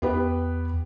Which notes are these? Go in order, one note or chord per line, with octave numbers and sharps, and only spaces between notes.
E2 B3 G4 B4